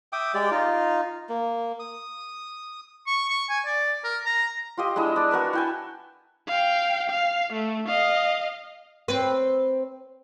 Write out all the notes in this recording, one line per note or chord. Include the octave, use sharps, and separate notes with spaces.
E5 G5 D6 D#6
G#3 G4 D5 G5
D#4 F4
A#3
D#6
C#6
C#6
G#5
D5
A#4
A#5
F4 G4 D#5
G#3 D4 E4 D#5
D4 D5
F#4 A#4 B4 E5
E4 G5 G#5
F5 G5
F5
A3
D#5 F5
C4 B4